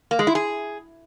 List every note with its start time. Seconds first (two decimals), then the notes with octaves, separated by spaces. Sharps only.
0.11 A#3
0.19 G#3
0.27 E4
0.35 G#4